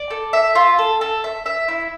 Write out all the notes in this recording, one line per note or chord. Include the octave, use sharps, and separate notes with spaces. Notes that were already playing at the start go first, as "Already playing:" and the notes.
Already playing: D5
A4
E5
F4
A4
A4
E5
E5
E4